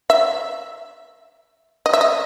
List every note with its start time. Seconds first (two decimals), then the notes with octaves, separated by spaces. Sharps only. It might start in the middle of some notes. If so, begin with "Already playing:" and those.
0.10 E5
1.86 D#5
1.93 E5
2.01 D#5